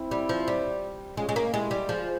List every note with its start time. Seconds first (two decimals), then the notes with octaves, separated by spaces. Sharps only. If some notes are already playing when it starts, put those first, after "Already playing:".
Already playing: C4 E4
0.11 G3
0.29 F3
0.48 G3
1.17 G#3 C#4 F4
1.29 G#3
1.36 A#3
1.53 G#3 E4 G4
1.71 G3
1.88 F3 F4 G#4